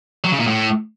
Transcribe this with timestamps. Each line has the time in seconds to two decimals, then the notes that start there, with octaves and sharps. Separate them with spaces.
0.24 F#3
0.32 C#3
0.40 A#2
0.47 A2